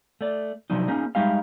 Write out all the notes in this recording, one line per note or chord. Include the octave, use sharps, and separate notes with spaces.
A3 D5
C3 F3 F#3 D4 D#4
A#3 C#4 D#4 G#4
G3 G#3 D#4 G4 E5 F5